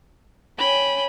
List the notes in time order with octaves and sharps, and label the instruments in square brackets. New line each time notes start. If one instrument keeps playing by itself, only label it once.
[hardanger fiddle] C#4 G5 [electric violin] B5